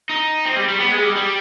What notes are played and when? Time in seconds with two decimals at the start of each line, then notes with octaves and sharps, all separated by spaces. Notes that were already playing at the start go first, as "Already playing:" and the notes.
0.09 D#4
0.45 C4
0.56 G3
0.68 G3
0.80 B3
0.91 G#3
1.04 G3
1.16 G3